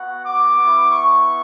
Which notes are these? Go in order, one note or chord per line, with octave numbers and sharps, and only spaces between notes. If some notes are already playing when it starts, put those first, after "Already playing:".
Already playing: B3 F#4 F#5
D6
B3 E4
C#6